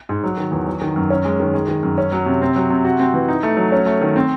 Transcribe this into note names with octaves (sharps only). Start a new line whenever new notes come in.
G#2
F#3
D#3
E2
F#3
D#3
F#2
C#4
G#3
D#3
G#3
D#3
F#2
C#4
F#3
C3
C4
F#3
C3
F#4
C4
E3
D#4
A3
F#3
C#4
A3
D#3
C4